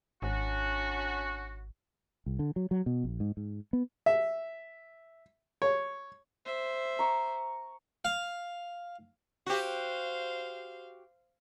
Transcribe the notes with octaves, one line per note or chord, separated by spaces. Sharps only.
G#1 C#4 D4 F#4
C2
D3
F#3
F#3
B2
A#1
G#2
G#2
B3
E5
C#5
C5 E5
A#5 C#6
F5
F#4 G4 C5 F5